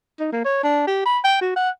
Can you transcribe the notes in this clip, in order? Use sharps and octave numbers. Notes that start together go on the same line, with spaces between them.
D#4
A#3
C#5
D4
G4
B5
G5
F#4
F#5